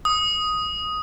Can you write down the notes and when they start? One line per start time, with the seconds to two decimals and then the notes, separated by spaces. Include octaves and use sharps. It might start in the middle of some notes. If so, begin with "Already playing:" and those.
0.05 D#6